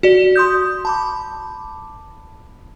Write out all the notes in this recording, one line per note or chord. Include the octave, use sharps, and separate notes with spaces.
F#4 D5
C6 D#6 G6
A5 B5 D6